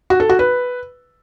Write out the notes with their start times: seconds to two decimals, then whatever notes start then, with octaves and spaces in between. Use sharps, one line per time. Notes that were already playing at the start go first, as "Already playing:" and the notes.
0.10 F#4
0.20 A4
0.29 F#4
0.39 B4